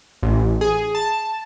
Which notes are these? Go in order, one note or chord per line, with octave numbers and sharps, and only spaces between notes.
A1
G#4
A5